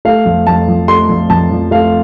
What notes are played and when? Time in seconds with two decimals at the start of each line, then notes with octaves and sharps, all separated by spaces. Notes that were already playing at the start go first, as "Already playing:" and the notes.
0.05 A3 F5
0.26 F2
0.47 F2 A5
0.68 F3
0.88 A3 C6
1.09 F2
1.30 F2 A5
1.51 F3
1.71 A3 F5